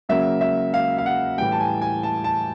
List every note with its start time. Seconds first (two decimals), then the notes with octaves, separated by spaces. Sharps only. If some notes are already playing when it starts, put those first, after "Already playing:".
0.09 C#3 F#3 A#3 E5
0.41 E5
0.74 F5
0.98 F5
1.06 F#5
1.38 A2 E3 G3 G5
1.52 A5
1.60 G#5
1.82 G#5
2.03 A5
2.24 A5